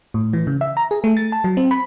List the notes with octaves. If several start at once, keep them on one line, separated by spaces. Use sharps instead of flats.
A2
E3
C#3
E5
A#5
G#4
A3
A6
A5
F#3
C4
B5